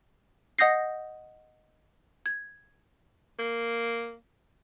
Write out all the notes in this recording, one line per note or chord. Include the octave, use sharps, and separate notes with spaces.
D#5 F#5 D#6 G6 A#6 C7
G#6
A#3